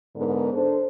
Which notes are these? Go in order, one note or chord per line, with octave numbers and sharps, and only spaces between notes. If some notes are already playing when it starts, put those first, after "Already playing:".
G#2 D3 B3 A#4
D4 A4 C5